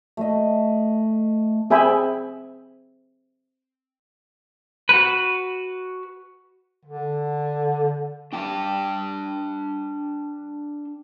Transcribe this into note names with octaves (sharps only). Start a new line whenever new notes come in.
A3 D#5
C4 G#4 E5 G5 G#5 B5
F#4 B4
D3
D4 G5 A5